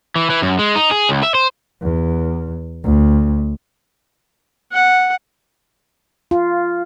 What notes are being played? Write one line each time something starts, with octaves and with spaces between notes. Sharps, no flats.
E3
E3
F#2
G#3
D#4
G#4
C#2
E5
C5
E2
D2
F#5
F4